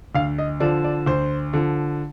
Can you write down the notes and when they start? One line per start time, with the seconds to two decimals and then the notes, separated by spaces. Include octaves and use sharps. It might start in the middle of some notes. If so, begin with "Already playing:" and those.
0.15 D2 F5
0.38 D#5
0.60 D3 F3 D5
0.84 D5
1.06 D2 C5
1.53 D3 F3